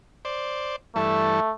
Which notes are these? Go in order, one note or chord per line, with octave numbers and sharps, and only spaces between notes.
C5 D5
G2 E3 A3 A4